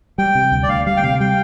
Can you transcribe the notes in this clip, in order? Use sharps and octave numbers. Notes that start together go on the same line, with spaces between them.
G3 G5
C3
D2
D5
D2 F5
G3 F5
G5
C3 F5
G3 G5